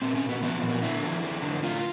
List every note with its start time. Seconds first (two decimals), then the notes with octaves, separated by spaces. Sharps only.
0.02 A#2 C4
0.15 C#4
0.22 A#2
0.29 B3
0.43 F3 B3
0.62 A#2
0.69 B3
0.82 D3 E4
1.03 F2
1.23 F2
1.42 D3
1.63 A2 F4